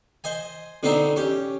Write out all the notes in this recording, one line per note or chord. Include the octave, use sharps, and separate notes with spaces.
C5 D#5 G#5
B2 D3 B3 C4 D4 D#4
C#4 G4